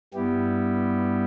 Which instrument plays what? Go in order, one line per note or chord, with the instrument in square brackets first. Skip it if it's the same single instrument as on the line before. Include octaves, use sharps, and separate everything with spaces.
[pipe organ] G2 G3 B3 E4 G4